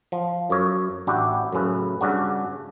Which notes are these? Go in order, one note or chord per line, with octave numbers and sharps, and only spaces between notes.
F3
F#2 C#5
A1 D4 E4 F#4 G4
F#2 A2 C#3 B4
G2 C#3 D4 F#4